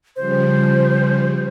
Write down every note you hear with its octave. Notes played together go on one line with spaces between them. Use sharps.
C#3 F3 G3 C5